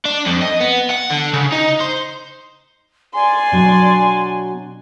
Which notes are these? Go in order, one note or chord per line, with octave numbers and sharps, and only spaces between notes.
D4
F2
D#5
B3
F#5
D3
C#3
D#4
C5
D5 G#5 C6
B2 F#3 D4